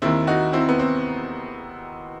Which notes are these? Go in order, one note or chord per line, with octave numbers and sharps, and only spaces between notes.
D#2 D#3 C4 E4
D#4 F#4
C4 E4
B3
C4